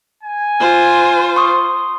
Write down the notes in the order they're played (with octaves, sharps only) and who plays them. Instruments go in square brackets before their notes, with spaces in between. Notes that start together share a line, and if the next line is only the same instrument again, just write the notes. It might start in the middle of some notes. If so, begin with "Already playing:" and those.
[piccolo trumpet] G#5
[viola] F4 C5
[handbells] C6 C#6 D#6